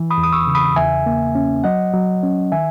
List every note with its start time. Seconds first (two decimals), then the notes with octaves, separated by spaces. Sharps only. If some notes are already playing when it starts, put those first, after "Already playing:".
Already playing: E3
0.10 B5 D#6
0.18 E2
0.23 D#6
0.32 C#6 E6
0.47 C#3
0.55 B5 D#6
0.76 E2 E5 G#5
1.06 A#3
1.35 C#4
1.64 F#3 D#5 F#5
1.94 F#3
2.23 C#4
2.52 D#3 E5 G#5